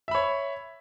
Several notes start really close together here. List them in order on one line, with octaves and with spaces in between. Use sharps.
E5 B5 C#5